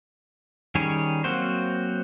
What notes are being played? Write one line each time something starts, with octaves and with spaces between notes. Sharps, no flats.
D#3 G3 C#4 G#4 C#5
F#3 A#3 C4 F#4 C5